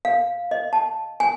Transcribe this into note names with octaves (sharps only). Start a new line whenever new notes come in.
F5
D#5
A5
G#5